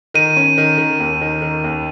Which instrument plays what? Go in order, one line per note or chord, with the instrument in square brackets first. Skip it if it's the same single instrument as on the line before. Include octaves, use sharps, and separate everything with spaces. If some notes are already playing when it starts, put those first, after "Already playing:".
[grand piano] D#3 [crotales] D#7
[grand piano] C#4
D#3
D#3
D#2
D#3
D#3
D#2